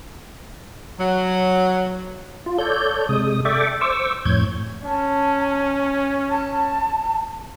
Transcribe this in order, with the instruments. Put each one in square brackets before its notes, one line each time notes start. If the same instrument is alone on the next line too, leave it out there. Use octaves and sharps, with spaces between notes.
[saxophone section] F#3
[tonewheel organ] F4
A4 C#5 D5 G6
C3 G#3 D#6
A4 D5 E5 G5 C#6 D6
C5 C#6 D6 E6
F2 A2 C#5 G6 G#6
[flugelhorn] C#4 [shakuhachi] A5
[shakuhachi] A5